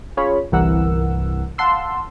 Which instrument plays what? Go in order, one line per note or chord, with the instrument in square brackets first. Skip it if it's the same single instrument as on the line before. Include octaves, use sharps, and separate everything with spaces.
[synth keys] C#4 F4 G#4 C#5 B5
G1 C2 E3 A#4 F#5 E6
F5 F#5 A5 C6 E6